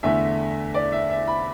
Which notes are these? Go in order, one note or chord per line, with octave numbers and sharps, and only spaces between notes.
E2 D3 A3 E5
D5
E5
E5
B5